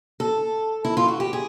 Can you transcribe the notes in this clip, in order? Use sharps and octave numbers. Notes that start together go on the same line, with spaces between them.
A4
E4
F4
F#4
G4
G#4